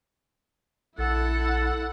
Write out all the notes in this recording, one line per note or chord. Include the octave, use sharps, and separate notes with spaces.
A#1 E4 A4 F#5